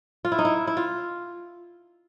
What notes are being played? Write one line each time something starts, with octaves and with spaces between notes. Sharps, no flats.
F4
E4
D#4
E4
E4
F4